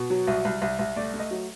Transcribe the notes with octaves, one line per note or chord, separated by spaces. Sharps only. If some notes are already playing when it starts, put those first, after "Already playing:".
Already playing: B2
F#3
C2
C2
C2
C2
A3 D5
A3
D#5
F#3